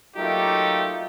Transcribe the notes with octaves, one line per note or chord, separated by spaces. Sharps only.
F#3 A3 A#3 D#4 F4 G4